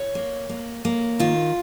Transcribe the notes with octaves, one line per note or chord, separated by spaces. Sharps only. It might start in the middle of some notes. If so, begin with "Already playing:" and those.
Already playing: C#5
A#3
A#3
A#3
D#3 F4